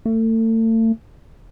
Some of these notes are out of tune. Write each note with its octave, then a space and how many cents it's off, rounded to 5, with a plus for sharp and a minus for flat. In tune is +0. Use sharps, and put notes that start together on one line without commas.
A3 +35